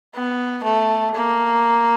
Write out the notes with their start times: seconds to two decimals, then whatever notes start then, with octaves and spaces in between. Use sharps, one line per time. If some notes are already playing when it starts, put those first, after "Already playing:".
0.15 B3
0.64 A3
1.15 A#3